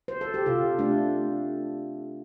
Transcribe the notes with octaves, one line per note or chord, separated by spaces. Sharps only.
C5
A4
G4
C3 F4
A3 D4